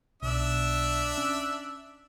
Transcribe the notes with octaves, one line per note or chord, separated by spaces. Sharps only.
B1 B2 D4 E5 E6
C#4